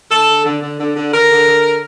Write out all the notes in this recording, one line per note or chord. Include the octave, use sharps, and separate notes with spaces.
D3 A4
D3
D3
D3
D3
D3
D3 A#4
D3
D3